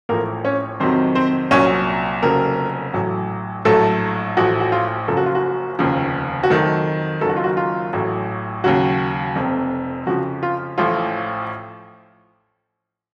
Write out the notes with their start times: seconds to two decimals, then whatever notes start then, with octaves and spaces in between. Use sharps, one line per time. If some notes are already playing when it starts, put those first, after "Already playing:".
0.09 A1 A2 F3 A#3 A#4
0.45 C#4 C#5
0.80 F2 C3 D#3 F#3 C4 C5
1.15 C4 C5
1.51 C2 A#2 F#3 C#4 C#5
2.22 F1 F2 C#3 F#3 A#3 A#4
2.94 A1 A2 F#3
3.65 A#1 A2 F#3 A3 A4
4.37 A1 A2 F3 F#4
4.60 F#4
4.72 F4
5.08 F#1 F#2 C#3 F3 A4
5.17 F#4
5.26 F4
5.35 F#4
5.79 F1 D#2 C#3 F3
6.43 F#4
6.50 F2 D#3 F#3 A3 A4
7.21 F#1 F#2 D#3 F#3 A4
7.29 F#4
7.36 F4
7.44 F#4
7.57 F4
7.93 A1 A2 F#3
8.64 D#2 C#3 F#3 F#4
9.36 F1 F2 C3
10.06 F2 C#3 F3 F#4
10.43 F4
10.78 A1 A2 F3 F4